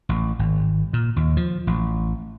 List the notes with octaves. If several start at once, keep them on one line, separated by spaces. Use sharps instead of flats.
A1
G#1
A#2
D#2
F3
A1